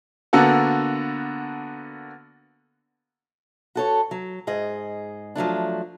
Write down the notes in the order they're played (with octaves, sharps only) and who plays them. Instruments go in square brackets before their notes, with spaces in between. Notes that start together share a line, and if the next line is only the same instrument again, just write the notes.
[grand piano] D3 A#3 B3 F#4 A4
[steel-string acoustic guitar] F#4 A4 C#5
F#3
G#2 G#4 D#5
F3 F#3 A3 D4